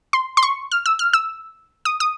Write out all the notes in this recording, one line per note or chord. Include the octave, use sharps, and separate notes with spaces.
C6
C6
C#6
F6
E6
F6
E6
D#6
D#6